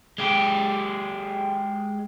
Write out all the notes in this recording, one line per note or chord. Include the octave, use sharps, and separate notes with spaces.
G#3 G4